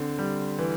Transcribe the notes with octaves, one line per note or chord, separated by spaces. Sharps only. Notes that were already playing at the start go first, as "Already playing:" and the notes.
Already playing: D3 C4
G3
E3